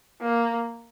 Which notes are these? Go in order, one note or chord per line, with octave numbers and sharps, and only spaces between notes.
A#3